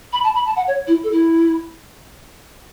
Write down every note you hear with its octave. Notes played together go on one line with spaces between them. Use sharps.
B5
A5
B5
A5
F#5
C#5
E4
A4
E4